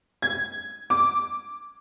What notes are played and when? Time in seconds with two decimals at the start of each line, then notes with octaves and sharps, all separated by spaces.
0.22 G#6
0.90 D6